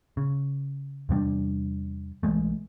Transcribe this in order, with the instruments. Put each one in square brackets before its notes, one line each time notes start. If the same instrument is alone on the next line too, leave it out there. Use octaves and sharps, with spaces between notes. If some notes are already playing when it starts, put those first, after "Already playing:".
[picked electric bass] C#3
E2 C3 G3 D4
B1 E3 G#3 A3